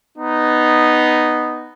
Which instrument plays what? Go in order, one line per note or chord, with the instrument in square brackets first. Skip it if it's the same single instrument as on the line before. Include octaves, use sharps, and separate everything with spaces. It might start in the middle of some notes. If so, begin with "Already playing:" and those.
[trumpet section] B3 D#4